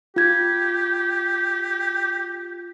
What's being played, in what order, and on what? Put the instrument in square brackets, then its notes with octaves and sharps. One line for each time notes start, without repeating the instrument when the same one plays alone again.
[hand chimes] F4 G#6 [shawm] G4